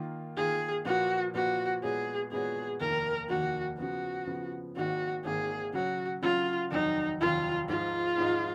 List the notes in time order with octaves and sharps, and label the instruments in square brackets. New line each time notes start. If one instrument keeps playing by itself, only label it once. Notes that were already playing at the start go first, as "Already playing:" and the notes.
Already playing: [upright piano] D#3 A#3 F4
[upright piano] D#3 A#3 F4 [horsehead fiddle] G#4
[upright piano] A#2 F3 A#3 F4 B4 [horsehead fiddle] F#4
[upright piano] A#2 F3 A#3 F4 B4 [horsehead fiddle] F#4
[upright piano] A#2 G#3 B3 F#4 C#5 [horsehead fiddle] G#4
[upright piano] A#2 G#3 B3 F#4 C#5 [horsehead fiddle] G#4
[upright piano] F1 D#2 D#3 A#3 [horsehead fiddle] A#4
[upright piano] F1 D#2 D#3 A#3 [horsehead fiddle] F#4
[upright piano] C#3 F3 B3 [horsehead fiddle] F#4
[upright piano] C#3 F3 B3
[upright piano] G#1 G#2 D#3 A#3 [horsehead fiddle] F#4
[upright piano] G#1 G#2 D#3 A#3 [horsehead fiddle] G#4
[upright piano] C#3 F#3 C#4 [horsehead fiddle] F#4
[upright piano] C#3 F#3 C#4 [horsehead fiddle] F4
[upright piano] F1 D#2 D#3 F#3 [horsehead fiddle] D#4
[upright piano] F1 D#2 D#3 F#3 [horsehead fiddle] F4
[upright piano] G#2 F3 G#3 D#4 [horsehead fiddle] F4
[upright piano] G#2 F3 G#3 D#4